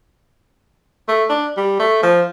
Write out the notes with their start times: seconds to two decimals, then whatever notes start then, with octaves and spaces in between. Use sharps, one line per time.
1.08 A3
1.30 D4
1.57 G3
1.80 A3
2.03 F3